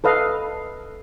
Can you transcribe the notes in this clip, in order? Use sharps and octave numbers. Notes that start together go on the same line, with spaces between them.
A4 B4 D#5 F5